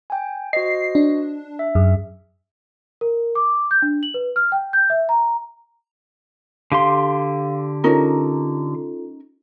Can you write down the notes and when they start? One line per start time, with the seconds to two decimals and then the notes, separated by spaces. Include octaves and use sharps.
0.10 G5 G#5
0.53 F#4 C5 D#5 C7
0.95 D4
1.59 E5
1.75 F#2 G#4
3.01 A#4
3.35 D6
3.71 G6
3.82 D4
4.03 F#7
4.14 B4
4.36 F6
4.52 G5
4.73 G6
4.90 E5
5.09 A#5
6.72 D3 G4 F5 C6
7.84 C#4 D#4 F4 A4 A#4